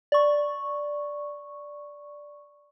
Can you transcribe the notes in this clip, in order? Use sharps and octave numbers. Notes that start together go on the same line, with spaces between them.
D5 C#6